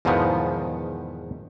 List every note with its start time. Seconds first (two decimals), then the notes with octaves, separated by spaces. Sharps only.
0.05 E2 G#2 B2 D#3 F3 B3